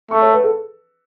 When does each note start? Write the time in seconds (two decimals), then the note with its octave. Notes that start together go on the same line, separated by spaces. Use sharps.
0.11 A3 C#6
0.22 C#5
0.33 B4
0.44 A4